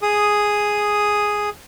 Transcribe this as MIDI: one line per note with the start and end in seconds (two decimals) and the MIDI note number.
0.02 1.49 68
0.02 1.49 87